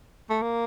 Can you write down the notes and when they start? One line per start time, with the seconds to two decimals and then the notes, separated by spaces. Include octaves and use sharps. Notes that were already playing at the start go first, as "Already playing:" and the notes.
0.30 A3
0.42 A#3